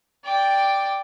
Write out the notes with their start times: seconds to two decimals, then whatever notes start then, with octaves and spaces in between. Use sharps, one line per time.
0.25 D5 G5